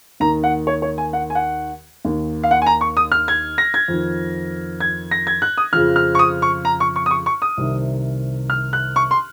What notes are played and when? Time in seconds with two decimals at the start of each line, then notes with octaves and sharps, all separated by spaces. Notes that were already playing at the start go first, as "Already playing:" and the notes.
0.20 D#2 D#3 A#5
0.43 F#5
0.67 C#5
0.82 C#5
0.98 G#5
1.13 F#5
1.30 G#5
1.35 F#5
2.05 D#2 D#3
2.44 F5
2.51 F#5
2.62 G#5
2.66 A#5
2.81 C#6
2.97 D#6
3.12 F6
3.28 G#6
3.58 A#6
3.74 G#6
3.88 F2 D#3
4.80 G#6
5.11 A#6
5.27 G#6
5.42 F#6
5.58 D#6
5.73 F2 C#3 F3 F6
5.96 F6
6.15 C#6
6.19 D#6
6.42 C#6
6.65 A#5
6.80 C#6
6.96 C#6
7.06 D#6
7.11 C#6
7.26 C#6
7.42 D#6
7.57 C2 C3 D#3
8.50 F6
8.73 F#6
8.96 C#6
9.11 C6